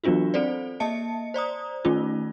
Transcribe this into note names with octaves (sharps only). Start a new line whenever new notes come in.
E3 F#3 B3 D4 F4 F#4
C4 A4 C5 D5
A#3 D#5 E5 A5 C#7
C5 D5 A#5 D#6
D#3 A3 C#4 D#4 F4